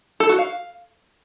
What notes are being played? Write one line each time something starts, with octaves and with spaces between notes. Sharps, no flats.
A4
F#4
F5